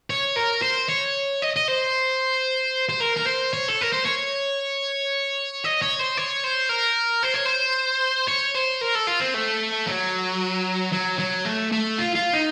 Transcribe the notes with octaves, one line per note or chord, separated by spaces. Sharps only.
C#5
A#4
C5
C#5
D#5
D#5
C5
C5
A#4
A#4
C5
C#5
A4
A#4
C5
C#5
D#5
C#5
C5
C#5
C5
A#4
C5
C#5
C5
C#5
C5
A#4
A4
F4
C4
A3
F#3
F#3
F#3
A3
A3
F4
F4
D#4